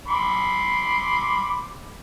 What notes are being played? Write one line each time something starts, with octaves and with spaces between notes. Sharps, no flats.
B5 C6 D6